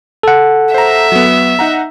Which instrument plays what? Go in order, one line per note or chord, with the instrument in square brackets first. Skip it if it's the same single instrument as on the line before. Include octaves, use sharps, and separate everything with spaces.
[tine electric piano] A4 F#5
[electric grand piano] C5 A#5 [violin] E5
[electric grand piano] F#3 B3
D#4 F#5 A#5